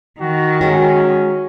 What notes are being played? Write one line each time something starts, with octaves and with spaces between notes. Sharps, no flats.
D#3 F#4
G#3 C#4 F#4